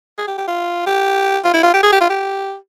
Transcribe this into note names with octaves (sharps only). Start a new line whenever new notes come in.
G#4
G4
G4
F4
G4
F4
E4
F4
G4
G#4
G4
F4
G4